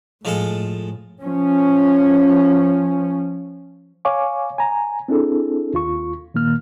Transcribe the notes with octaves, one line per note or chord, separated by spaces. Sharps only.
A2 F3 G#3 A4
F3 C#4
C#5 F5 G#5 C#6 D6
G#5 A#5
C4 D4 E4 G#4 A4
D#2 F4 C#6
A#2 D#3 A#3 F6